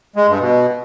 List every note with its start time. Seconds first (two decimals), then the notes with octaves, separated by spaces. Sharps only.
0.16 G#3
0.28 G2
0.40 B2